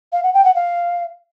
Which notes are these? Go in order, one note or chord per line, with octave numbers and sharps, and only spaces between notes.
F5
F#5
G5
F#5
F5